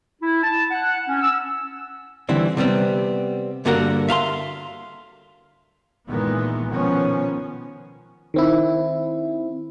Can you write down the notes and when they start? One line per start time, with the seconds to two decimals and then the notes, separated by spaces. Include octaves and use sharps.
0.21 E4
0.43 A5
0.71 F#5
1.08 C#4
1.21 E6
2.29 D3 E3 G3 C4
2.57 C3 G3 B3 C4
3.65 G2 D3 A#3 F#4 A#4 F#5
4.08 E5 F5 A5 C6
6.08 A#2 D#3 E3 G#3 B3
6.69 B2 D#3 F3 B3 C#4
8.34 D#3 C4 E4